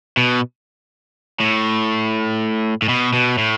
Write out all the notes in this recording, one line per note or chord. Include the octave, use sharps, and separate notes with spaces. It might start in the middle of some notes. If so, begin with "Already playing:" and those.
B2
A2
A2
B2
B2
A2